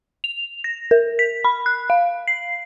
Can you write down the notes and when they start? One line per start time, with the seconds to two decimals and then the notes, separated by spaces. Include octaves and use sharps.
0.24 F7
0.64 A#6
0.91 A#4
1.19 B6
1.44 B5
1.66 F#6
1.90 F5
2.28 C7